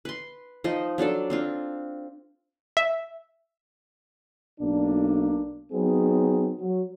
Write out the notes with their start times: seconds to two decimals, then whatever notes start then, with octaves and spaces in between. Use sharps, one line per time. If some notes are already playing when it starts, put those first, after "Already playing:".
0.05 B4 C6
0.64 F3 D#4 D#5
0.98 F#3 D4 A4 D5
1.30 C4 D4 F4
2.77 E5
4.60 B1 B2 A#3 D4
5.73 F#3 B3 C4 D#4 G#4
6.58 F#3